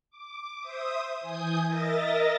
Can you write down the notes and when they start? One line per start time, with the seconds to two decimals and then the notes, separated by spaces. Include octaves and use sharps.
0.10 D6
0.59 C5 E5 D#6
1.20 E3 G#5 D#6 G6
1.66 A#4 D#5 E5 A6 A#6